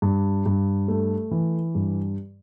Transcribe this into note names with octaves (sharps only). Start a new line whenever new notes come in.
G2
G2
A3
E3
G2